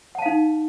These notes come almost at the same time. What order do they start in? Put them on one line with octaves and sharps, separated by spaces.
F#5 A5 F5 D#4